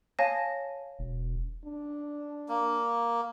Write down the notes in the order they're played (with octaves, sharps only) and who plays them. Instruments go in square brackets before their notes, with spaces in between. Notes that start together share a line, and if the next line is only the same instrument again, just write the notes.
[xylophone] C#5 F5 G#5 A5 A#6
[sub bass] E1
[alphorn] D4
[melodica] A#3